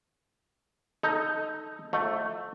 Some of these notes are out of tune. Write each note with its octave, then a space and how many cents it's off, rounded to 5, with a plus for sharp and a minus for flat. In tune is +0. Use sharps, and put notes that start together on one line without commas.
D#4 +0 A4 +0
F3 +40 A3 +0 D#5 +0